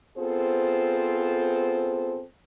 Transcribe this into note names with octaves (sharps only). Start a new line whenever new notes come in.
B3 C4 F4 G#4 A4 C5